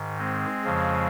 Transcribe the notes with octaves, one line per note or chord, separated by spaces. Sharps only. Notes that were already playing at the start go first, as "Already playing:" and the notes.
Already playing: G#2 D#3
G#3 C4
F2 C#3 F3